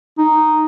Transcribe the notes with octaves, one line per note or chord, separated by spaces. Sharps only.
D#4